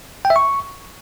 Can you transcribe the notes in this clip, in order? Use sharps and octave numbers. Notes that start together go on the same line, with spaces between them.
G5
E5
C#6